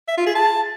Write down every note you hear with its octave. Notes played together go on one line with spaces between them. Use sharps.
E5
F4
G#4
A5